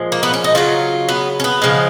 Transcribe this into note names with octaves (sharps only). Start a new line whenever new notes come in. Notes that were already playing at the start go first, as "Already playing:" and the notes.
Already playing: A#2 F3 G#3
A#3
B3
C#4
D#4
C#3 F#3 F4
B3
C#4
B3
C#3 F3 G#3